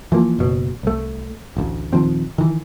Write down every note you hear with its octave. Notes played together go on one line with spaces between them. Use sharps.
E3 F3 A#3
F#1 B2
C2 A3
A1 D2
D#1 D#3 F3 C4
D#3 E3